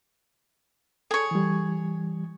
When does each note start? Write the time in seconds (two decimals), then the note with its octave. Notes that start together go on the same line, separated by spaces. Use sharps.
1.11 G#4 A4 C#5
1.31 E3 G3